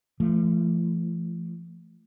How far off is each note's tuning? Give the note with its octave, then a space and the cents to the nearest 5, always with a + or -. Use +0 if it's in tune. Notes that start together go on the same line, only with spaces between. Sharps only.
F3 -40 A3 +0